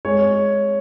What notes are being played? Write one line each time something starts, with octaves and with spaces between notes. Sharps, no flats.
G#3 C#5